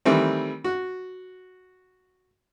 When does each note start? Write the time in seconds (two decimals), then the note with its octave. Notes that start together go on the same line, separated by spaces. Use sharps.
0.05 D#3 E3 G3 A3 C4
0.64 F#4